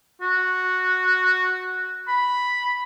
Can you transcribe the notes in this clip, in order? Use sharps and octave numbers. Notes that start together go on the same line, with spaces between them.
F#4
B5